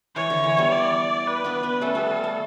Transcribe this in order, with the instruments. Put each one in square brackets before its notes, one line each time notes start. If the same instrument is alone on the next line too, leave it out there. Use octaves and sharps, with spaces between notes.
[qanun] E3 [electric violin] C#5
[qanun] D3
E3
G3 B3
[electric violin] D5
B4
[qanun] B3 D4
B3 D4
[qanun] A3 C#4 [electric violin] A4
[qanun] G3 B3
A3